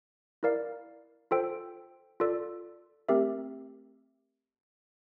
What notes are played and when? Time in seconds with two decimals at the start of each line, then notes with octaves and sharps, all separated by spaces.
0.43 E4 A#4 D5 F5
1.31 F4 A4 C5 G5
2.20 F4 A4 D5
3.09 A3 C4 G4 A#4 E5